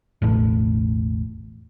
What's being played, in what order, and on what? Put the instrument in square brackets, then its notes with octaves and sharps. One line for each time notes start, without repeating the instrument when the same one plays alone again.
[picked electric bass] E1 A1 A2